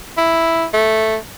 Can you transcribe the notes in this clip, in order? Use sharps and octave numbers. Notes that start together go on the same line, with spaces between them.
E4
A3